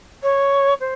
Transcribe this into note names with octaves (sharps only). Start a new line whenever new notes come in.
C#5
C5